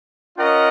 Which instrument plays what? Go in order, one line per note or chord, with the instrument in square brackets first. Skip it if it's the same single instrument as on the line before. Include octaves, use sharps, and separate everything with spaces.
[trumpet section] C#4 F4 A#4 D#5 F#5